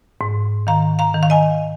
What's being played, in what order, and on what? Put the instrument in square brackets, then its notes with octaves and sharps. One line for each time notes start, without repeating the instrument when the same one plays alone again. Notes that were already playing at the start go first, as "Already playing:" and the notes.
[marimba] G#2
D#3 F5 A#5
F5 A#5
D#3
F5
D#5 G#5